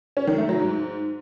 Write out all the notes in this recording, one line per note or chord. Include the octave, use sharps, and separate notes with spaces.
C#4
D#3
A3
F#3
G#2